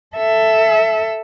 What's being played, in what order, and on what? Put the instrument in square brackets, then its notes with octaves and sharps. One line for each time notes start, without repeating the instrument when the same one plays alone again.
[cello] A4 E5